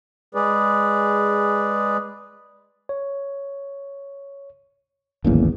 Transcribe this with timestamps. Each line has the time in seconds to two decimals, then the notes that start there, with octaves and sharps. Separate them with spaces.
0.35 G#3 G#4 B4 D5
2.89 C#5
5.25 D1 G#1 E2 A#3 C#4